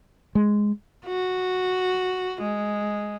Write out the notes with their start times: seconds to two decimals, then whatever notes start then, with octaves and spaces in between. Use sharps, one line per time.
0.35 G#3
1.06 F#4
2.42 G#3